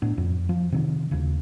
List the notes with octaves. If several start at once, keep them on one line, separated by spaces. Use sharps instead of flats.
A2 B3 D4
F2
F3
C3 D#3
D#2 C#3